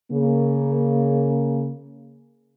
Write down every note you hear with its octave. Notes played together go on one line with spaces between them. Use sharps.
C#3 A#3